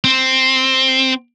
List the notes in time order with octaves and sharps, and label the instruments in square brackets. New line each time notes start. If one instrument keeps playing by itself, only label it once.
[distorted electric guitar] C4